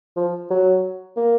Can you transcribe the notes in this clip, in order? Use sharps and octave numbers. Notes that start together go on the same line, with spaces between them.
F3
F#3
A#3